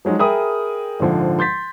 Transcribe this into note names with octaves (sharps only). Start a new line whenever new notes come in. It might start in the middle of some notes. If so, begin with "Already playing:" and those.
F3 F#3 G#3 D#4
G#4 A#4 E5 G5 B5 D#6
A#1 G#2 D3 F3
C6 G6 A6 B6